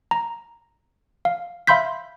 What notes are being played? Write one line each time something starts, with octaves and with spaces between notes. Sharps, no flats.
A#5
F5
E5 F5 B5 C6 G6 B6